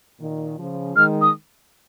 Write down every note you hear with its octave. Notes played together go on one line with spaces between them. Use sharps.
A#2 D#3
C#3 F3
D#3 G#3 F6
D#6